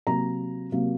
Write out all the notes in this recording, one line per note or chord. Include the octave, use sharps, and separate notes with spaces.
C3 F#3 A#3 A#5
C3 F#3 A#3